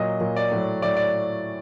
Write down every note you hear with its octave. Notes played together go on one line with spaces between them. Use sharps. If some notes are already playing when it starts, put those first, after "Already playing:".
Already playing: A#2 F#3 D#5
A#2 F#3
D5
A2 F#3
A2 F#3 D5
D5